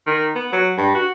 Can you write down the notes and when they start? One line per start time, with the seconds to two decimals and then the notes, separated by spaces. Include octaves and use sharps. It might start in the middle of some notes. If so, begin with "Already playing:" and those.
0.07 D#3
0.35 B3
0.53 F#3
0.78 G2
0.95 F#4